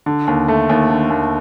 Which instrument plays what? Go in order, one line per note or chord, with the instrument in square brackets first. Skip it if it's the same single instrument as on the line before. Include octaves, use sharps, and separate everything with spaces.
[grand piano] D3
D#2
A3
D#2
D3
D#2